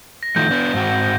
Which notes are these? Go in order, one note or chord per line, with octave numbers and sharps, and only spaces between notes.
A#6
D#3 F3 A3 G6
B3 D4
G#2 C4 F#4